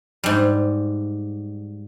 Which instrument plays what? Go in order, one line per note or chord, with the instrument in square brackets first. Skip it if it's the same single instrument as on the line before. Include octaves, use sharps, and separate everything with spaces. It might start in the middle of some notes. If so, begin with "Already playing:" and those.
[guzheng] G#2 G3